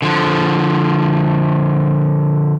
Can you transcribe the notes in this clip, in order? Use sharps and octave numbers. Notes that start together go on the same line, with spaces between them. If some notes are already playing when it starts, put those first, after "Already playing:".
D3 F3